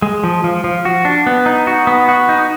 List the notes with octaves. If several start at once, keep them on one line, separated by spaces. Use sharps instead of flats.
G#3
F3
F3
F3
F#4
D4
B3
D#4
F#4
B3
F#4
D#4